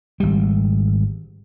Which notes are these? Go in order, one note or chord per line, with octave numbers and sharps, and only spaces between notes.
G#1 G3